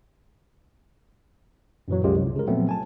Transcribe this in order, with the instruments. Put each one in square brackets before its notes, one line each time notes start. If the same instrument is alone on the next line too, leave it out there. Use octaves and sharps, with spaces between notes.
[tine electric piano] F#2 A#2 E3 F#3
C2 F#2 G3 G#3 F4 G4
C2
C#3 G#3 A#4
A#2 F3 F#3 A3 B3 C4
G#5 A5